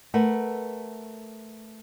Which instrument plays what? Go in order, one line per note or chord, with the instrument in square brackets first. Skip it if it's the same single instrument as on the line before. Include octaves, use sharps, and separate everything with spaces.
[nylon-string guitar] A3 A#4 B4 F#5